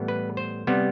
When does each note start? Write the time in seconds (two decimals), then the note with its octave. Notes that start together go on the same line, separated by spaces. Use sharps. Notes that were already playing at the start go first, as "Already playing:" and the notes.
Already playing: A2 E3 G3 B3
0.08 B4
0.37 C5
0.67 C3 G3 B3